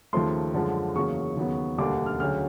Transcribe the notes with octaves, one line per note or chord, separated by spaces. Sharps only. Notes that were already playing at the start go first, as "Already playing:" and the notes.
D#2 C#3 F3 A3 C6
F#2 D3 F3 G#3
E2 C#3 F#3 A#3 C#6
D#2 C#3 F#3 B3
E1 D2 D3 G3 A#3 D6
F6
D2 C#3 F#3 F6